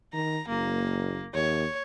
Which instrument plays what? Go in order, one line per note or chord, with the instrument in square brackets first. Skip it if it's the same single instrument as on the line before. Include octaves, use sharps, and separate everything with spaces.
[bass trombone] D#3 [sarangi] A#5
[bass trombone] F#1 [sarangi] A#3
[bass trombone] D#2 [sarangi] C#5